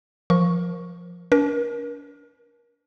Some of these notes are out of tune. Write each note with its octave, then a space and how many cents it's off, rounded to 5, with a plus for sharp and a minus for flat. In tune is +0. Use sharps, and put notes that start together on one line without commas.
F3 +0 A#4 +20 C#6 +0
D4 -40 A#4 +35